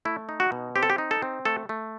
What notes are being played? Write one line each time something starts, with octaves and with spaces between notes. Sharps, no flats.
A3 E4
D#4
F#4
B2
C4 G4
A4
G4
D#4
A4
C4
A3 A4
A3